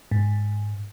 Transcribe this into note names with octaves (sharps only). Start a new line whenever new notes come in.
G#2